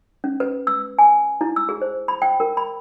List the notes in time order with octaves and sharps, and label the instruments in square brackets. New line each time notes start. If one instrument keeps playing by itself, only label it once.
[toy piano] C#4
B4
E6
G#5
E4
E6
G#4
C5
B5
G5
A#4
B5